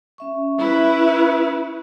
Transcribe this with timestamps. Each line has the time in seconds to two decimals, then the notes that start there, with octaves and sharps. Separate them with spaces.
0.18 C#4 E5 C#6
0.59 E4 B4